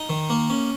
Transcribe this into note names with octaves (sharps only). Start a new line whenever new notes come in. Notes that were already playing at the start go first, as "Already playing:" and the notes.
Already playing: D#4
D#3
A#3
C#4